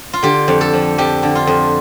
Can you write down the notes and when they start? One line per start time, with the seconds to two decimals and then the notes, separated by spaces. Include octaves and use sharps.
0.13 F4
0.23 D3 G4
0.48 F2
0.61 A4
0.73 F3
0.98 F2 G4
1.23 D3
1.35 F4
1.47 F2